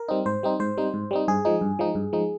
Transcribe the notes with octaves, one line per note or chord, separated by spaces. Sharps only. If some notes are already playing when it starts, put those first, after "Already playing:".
Already playing: A#4
G3 C4 D#4
G#2 C5
G3 C4 D#4
G#2 C5
G3 C4 D#4
G#2
G3 C4 D#4
G2 G#4
F3 G#3 D#4
G2
F3 G#3 D#4
G2
F3 G#3 D#4